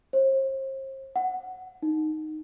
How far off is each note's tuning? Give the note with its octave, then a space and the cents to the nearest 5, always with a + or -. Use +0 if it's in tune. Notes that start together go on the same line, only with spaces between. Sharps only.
C5 +40
F#5 +0
D#4 -5